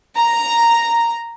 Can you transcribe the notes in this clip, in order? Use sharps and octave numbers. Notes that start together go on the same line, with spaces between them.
A#5